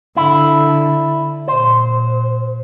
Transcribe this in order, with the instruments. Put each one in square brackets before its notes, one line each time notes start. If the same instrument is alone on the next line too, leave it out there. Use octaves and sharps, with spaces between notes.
[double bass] D3 [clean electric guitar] E4
[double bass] A#2 [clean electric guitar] C5